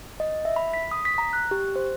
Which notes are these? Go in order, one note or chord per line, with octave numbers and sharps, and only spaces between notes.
D#5
E5
B5
B6
D#6
B6
A#5
F#6
G4
C5